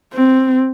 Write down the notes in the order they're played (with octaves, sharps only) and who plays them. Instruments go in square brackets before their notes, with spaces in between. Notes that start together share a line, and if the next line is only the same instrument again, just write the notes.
[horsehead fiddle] C4